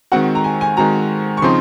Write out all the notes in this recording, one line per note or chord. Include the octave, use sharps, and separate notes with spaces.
D#3 G#3 C4 F#4 F#5
A#5
G#5
G#5
D#3 G#3 C4 F#4 A#5
C#6
C#3 F3 C4 D#4 C6